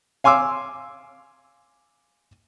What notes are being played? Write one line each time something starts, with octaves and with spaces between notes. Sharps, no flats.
F5 G#5 C6 D6 E6